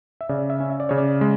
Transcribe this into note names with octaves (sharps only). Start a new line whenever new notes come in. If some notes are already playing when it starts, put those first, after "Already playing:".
E5
C#3 D5
E5
C#4
E5
D5
C#3 C#5
D5
G#3